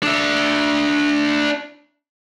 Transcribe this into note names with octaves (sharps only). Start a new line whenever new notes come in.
D4 E5